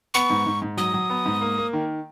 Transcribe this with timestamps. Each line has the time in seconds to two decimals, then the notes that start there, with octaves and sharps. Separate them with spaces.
0.14 B3 C#6
0.30 G#2
0.46 G#2
0.62 G#2
0.77 F#3 D#6
0.94 F#3
1.10 B3
1.26 G#2
1.41 A#3
1.58 A#3
1.73 D#3